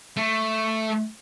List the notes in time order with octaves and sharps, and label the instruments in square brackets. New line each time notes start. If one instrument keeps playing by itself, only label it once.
[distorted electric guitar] A3